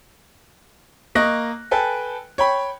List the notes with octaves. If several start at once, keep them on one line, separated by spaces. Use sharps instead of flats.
A#3 D#5 C#6 F#6 A#6
A4 B4 G5 G#5
C#5 G5 B5